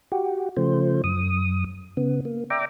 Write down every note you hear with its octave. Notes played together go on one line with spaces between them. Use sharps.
F#4 G4
C#3 F3 A3 C5
F#2 D#6
C#3 B3
A#3
D5 E5 G5 A#5 D6